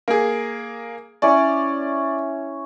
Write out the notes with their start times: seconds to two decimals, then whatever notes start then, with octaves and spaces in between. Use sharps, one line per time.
0.08 A#3 G#4
1.22 C#4 E4 C#5 D5